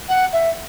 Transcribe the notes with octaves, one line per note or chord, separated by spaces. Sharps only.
F#5
E5